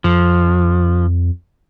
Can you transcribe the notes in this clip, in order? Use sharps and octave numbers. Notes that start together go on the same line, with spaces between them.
F2 F3